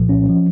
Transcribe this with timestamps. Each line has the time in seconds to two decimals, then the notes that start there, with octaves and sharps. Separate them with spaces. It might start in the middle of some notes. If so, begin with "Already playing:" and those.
Already playing: C2 A#2 F3
0.09 C#4
0.29 F3